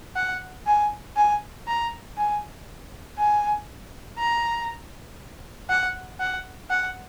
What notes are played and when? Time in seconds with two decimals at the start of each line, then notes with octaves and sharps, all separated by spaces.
0.16 F#5
0.66 G#5
1.16 G#5
1.67 A#5
2.17 G#5
3.18 G#5
4.18 A#5
5.69 F#5
6.20 F#5
6.70 F#5